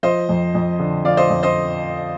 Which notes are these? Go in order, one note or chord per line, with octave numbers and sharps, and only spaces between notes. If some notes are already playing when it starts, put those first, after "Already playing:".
F3 C5 D#5
F2
F2
D3
F3 D5 F5
C5 D#5
F2
C5 D#5